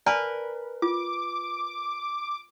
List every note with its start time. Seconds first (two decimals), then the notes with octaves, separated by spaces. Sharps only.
0.06 A#4 B4 D5 G#5 A5
0.82 F4 D6